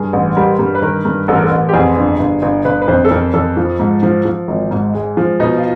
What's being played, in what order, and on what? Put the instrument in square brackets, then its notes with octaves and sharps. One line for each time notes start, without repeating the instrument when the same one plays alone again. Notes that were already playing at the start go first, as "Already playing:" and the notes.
Already playing: [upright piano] G2 [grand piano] G#4
[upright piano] A1
[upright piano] G3 [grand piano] A#4
[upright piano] G2
[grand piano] B4
[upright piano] D#3 [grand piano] A#4
[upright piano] G2
[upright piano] A1 [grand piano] A4
[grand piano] A#4
A4
[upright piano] A1
[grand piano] G4
[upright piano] F2 [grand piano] G#4
[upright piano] G1
G1
G1
[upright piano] G1 [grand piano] B4
[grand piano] B4
[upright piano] F2 [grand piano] C5
[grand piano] A4
[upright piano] F2 [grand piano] A#4
[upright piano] F2 [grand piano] A4
[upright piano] F3
G#2
F3
F3
G#1
G#2
G#3
F3
[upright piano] B2 [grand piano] D#4
[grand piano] F4